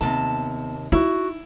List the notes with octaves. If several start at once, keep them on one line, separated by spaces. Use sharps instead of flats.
D#2 C3 B3 A5
D#4 E4 F#4